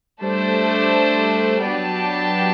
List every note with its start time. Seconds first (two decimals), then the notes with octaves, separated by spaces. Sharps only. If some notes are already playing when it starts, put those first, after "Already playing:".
0.21 G3 A3 D4 A4 C5
1.65 F#3 B3 D4 G4 D5 A5